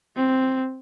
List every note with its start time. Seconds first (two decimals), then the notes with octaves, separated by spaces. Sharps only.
0.16 C4